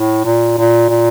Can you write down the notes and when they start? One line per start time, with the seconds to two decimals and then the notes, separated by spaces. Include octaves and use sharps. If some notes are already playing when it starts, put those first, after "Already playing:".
Already playing: A2
0.25 A#2
0.58 A#2
0.89 A#2